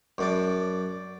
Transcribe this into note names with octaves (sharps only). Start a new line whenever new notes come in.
F#2 D4 D5